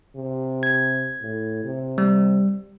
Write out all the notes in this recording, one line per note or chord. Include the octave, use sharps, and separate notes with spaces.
C3
G#6
A2
C3
G3